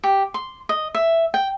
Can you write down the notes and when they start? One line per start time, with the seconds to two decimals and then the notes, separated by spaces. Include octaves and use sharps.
0.04 G4
0.34 C6
0.69 D#5
0.95 E5
1.34 G5